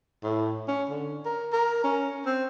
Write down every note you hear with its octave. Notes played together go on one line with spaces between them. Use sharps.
A2
C#4
D3
A#4
A#4
C#4
C4